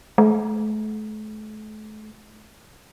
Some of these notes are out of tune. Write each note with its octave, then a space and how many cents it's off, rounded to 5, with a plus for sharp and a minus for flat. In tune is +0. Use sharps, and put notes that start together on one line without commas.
A3 -40